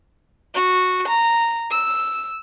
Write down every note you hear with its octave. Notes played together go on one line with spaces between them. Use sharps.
F#4
A#5
E6